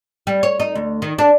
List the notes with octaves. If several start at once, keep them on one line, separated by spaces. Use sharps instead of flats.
G3
C#5
D#4
D2
D#3
D4